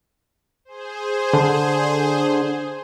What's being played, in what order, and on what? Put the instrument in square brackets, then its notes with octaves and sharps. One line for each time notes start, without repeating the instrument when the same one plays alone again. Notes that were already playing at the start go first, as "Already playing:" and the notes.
[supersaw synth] G#4 C5
[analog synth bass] D3